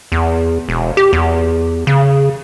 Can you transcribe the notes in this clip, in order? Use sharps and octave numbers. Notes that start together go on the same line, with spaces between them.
E2
E1
G4
E2
C#3